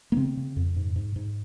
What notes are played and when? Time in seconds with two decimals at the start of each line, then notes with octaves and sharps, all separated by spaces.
0.12 A#3
0.17 C#3 C4
0.37 C#3
0.56 F2
0.76 G#2
0.96 G#2
1.16 G#2